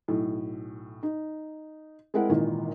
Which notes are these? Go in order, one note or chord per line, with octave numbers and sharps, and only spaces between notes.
B1 A2
D#4
G#3 C4 E4 A#4 F#5
G#1 A#2 D#3 E3